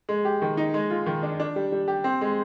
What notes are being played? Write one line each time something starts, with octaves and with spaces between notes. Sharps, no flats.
G#3
G4
D#3
D#4
G#3
F4
D#3
D4
D4
G3
G3
G4
C4
G#3